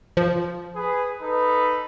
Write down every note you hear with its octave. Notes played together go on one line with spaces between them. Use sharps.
F3
G#4 B4
D#4 A4 B4